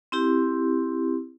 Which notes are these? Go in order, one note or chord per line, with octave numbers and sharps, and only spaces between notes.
C4 E4 G4